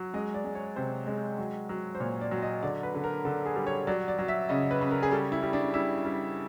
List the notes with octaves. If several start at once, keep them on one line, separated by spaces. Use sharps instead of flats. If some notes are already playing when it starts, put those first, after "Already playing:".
Already playing: F#3
G#3 D#5
D5
G#3
C#5
C3 C5
G#3
F#3
F#3
C5
A#2 C#5
D5
F#3
D#5
D3 D5
B4
D3
A#4
D3 A4
G#4
G3
C#5
F#3 D5
D5
F#3
E5
C#3 D#5
B4
C#3
A#4
G#4
G3 A4
E4
G3
D4
G3 E4
G3